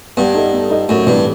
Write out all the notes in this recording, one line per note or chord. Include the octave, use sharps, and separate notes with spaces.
G2 B3
D#4 A4 D#5
B3
D#4 A4 D#5
F#2 A2
G2 E3 G3 C4